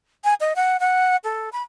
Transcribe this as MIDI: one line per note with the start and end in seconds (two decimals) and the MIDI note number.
0.24 0.34 80
0.40 0.53 75
0.56 0.77 78
0.80 1.16 78
1.24 1.49 69
1.53 1.62 83